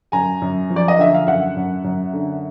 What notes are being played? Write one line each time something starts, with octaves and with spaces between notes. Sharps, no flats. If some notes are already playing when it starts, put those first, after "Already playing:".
F#2 G#5 A#5
F#2
F3
D5
D#5
D3 E5
F5
F#2 E5 F#5
F#2
F#2
D3